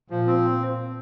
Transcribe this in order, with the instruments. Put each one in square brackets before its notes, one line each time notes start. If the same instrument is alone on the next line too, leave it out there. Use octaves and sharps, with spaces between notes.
[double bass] A#2 [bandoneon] F3
[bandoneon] C4